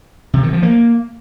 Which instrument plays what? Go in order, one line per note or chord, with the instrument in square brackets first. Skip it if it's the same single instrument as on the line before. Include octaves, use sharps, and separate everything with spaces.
[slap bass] C3
D#3
F3
A#3